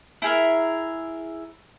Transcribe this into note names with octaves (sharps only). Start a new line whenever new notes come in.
E4 G#4 A#4